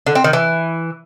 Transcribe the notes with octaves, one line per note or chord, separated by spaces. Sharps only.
D3
C4
D#3
E3